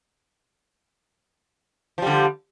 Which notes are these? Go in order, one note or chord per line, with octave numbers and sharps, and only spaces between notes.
D3 F3 G3